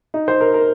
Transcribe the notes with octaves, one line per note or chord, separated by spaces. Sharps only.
D#4
C5
A#4
A#4